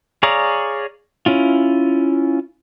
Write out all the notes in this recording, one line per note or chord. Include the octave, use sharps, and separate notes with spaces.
G#4 C#5 D5 F5 A#5
C#4 E4 F4